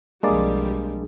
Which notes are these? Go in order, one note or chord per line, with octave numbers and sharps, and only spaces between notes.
B1 F2 G3 G#3 A#3 D4 G#4 D5